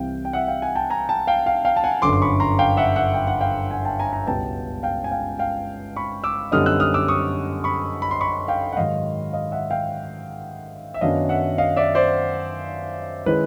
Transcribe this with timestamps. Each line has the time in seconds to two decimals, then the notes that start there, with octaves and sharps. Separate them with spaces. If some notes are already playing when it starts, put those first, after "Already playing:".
Already playing: C2 C3 E3 F5 G5
0.25 G5
0.33 E5 F#5
0.48 F5 G5
0.62 F#5 G#5
0.75 G5 A5
0.90 G#5 A#5
1.09 G5 A5
1.27 F5 G5
1.46 F5 G5
1.65 F5 G5
1.77 A5
1.84 F#5 G#5
2.02 G1 F#2 D3 C6 D6
2.13 C6
2.22 B5 C#6
2.40 A#5 C6
2.59 F5 G5
2.77 E5 F#5
2.96 E5 F#5
3.14 G5
3.27 F#5
3.41 F5 G5
3.71 F#5 G#5
3.85 G5 A5
4.00 G#5 A#5
4.13 G#5 A#5
4.27 C#2 B2 G3 B3 G5 A5
4.83 F5 G5
5.04 G#5
5.11 F5 G5
5.39 F5 G5
5.96 B5 C#6
6.24 D6 E6
6.52 F#2 D3 G3 B3 D#4 D#6 F6
6.66 E6 F#6
6.80 D#6 F6
6.94 D6 E6
7.08 C#6 D#6
7.64 B5 C#6
8.02 B5
8.11 C6
8.21 B5 C#6
8.48 F5 G5
8.72 F#5
8.77 G#2 D#3 F#3 D#5 F5
9.33 D#5 F5
9.52 E5 F#5
9.71 F5 G5
10.94 E5
11.01 F#2 D#3 F#3 B3 D4 D#5 F5
11.29 E5 F#5
11.58 D#5 F5
11.76 D5 E5
11.95 C5 D5
13.26 D#3 G#3 C#4 E4 B4